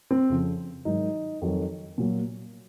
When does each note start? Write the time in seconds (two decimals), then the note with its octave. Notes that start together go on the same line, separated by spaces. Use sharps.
0.11 C4
0.29 F2 C#3 F3
0.85 G#2 D#3 F#3 D#4
1.42 F2 D#3 F#3
1.98 A#2 F#3